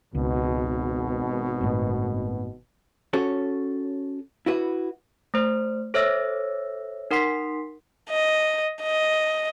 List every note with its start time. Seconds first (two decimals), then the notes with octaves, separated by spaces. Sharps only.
0.15 G#1 C#2 B2
1.61 G1 A2
3.13 C#4 F#4 A4 C#5
4.46 E4 F#4 B4
5.34 A3 C5
5.94 A4 C5 C#5 E5 E6 A#6
7.11 D#4 A#4 F#5 C6 B6 C7
8.10 D#5
8.82 D#5